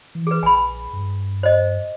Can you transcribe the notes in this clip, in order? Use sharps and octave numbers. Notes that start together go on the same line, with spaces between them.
E3
G#4 B4
A#1 G#5 B5
G2
C5 D#5